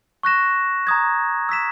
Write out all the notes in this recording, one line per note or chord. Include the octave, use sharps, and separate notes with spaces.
C#6 F#6 A#6 E7
A#5 D#6 G#6
E6 B6 E7